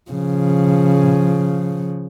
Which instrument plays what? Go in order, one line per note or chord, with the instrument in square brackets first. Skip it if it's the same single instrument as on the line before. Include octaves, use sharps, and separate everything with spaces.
[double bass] C#3 F3